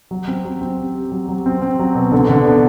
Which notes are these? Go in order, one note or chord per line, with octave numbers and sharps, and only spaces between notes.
F#3
C4
F#3
C4
G4
G4
F#3
F#3
C4
C4
F#3
B2
D3
D3
B3